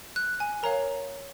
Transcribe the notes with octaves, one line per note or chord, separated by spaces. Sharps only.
F#6
G#5
A#4 C#5 F5 A#5